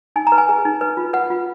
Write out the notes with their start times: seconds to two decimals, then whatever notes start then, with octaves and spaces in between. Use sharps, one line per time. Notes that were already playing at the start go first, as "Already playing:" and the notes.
0.16 D#4 G#5
0.27 A#5
0.32 B4
0.38 G#5
0.49 G#4
0.65 D#4
0.81 B4
0.97 F4
1.13 B4 F#5
1.30 F4